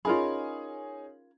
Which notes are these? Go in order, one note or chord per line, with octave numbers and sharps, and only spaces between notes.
C#4 D#4 F4 G#4 A#4 B5